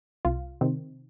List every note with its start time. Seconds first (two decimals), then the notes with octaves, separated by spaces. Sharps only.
0.25 C2 F4
0.61 C3 D#3 C4